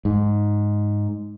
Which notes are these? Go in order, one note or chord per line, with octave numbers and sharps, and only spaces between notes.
G#2